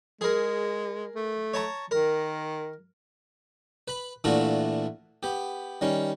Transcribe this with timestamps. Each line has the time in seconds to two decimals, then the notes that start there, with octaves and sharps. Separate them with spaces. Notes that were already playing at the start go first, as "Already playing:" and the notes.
0.21 G#3 G#4 A#4
1.15 A3
1.54 C#5 A5 A#5
1.91 D#3 A#4
3.88 B4 B5
4.24 A#2 E3 A3 D4 F4 F#4
5.23 B3 G4
5.81 D#3 G3 C#4